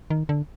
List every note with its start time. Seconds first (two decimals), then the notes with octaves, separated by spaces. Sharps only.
0.10 D#3
0.29 D3